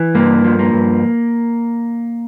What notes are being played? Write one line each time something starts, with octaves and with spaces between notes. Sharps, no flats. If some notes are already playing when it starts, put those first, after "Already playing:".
Already playing: E3
G2 A#3
F3
A#3
G2